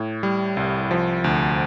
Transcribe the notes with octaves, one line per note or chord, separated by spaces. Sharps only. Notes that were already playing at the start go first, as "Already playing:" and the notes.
Already playing: A2
G3
C2
F3
D2